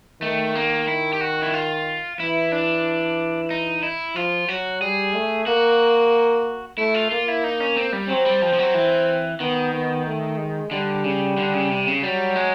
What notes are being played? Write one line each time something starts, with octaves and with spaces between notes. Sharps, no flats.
D#3 A3
A#3
E4
G4
F#4
E4
F4
E3 E4
D4
D#4
E4
F3 F4
F#3 F#4
G3 G#4
A3
A#3 F#4
A3 E4
F4
A#3 F4
E4
D#4
C#4
C4
G3
F#3 C4
G3
F3
F3
F#3
E3
D#3 B3
B3
A3
G#3
D3 G3
C#3
D3
C#3
C3
C#3
F#3 G3
G#3